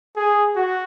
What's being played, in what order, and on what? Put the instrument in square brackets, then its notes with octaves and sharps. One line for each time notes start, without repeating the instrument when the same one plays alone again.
[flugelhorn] G#4
F#4